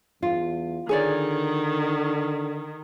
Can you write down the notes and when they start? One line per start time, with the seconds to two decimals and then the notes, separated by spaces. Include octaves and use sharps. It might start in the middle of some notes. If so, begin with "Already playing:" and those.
0.23 E2 F4
0.89 D3 D#3 G#4 C#5 D5